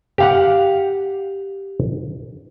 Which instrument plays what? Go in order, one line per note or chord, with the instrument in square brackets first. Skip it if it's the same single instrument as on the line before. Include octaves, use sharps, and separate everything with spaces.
[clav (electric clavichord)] G4 F5 F#5